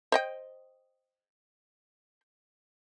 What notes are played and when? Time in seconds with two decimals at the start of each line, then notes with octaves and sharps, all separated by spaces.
0.12 C5 D#5 G5